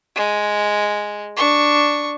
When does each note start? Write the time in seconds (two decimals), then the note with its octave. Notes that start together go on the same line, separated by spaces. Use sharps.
0.16 G#3
1.37 D4 C#6